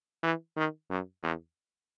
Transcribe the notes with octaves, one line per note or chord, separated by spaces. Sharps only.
E3
D#3
F#2
E2